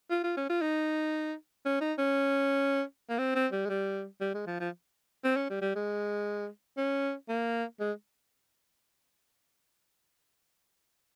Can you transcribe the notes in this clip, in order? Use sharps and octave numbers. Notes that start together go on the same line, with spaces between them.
F4
F4
C#4
F4
D#4
C#4
D#4
C#4
A#3
C4
C4
G3
G#3
G3
G3
G#3
F3
F3
C4
C#4
G3
G3
G#3
C#4
A#3
G#3